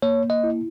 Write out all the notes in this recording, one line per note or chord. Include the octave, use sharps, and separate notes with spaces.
A#3 C#5
D#5
E4